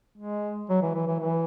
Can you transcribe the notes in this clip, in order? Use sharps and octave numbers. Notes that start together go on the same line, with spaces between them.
G#3
F#3
E3
E3
E3
E3